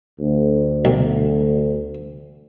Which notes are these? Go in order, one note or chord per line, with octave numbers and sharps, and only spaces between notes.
D2
B1